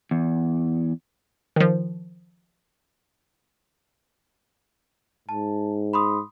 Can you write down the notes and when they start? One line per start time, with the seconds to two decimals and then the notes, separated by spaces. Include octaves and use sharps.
0.11 E2
1.56 D#3 F3
5.29 G#2 A5
5.93 B5 C6 D#6